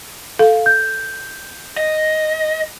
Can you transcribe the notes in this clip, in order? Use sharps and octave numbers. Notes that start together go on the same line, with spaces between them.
A4 F5
G6
D#5